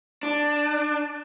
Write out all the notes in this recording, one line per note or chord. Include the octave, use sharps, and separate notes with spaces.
D4